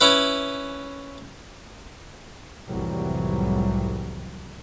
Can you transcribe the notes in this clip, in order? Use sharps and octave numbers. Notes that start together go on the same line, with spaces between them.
C#4 E4 B4
C2 F2 A2 E3 F#3 G3